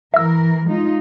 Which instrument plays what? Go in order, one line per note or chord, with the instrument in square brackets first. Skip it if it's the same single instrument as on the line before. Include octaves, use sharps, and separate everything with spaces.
[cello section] E3 A#4 [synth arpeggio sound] E5 E6
[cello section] G#3 D#4 F4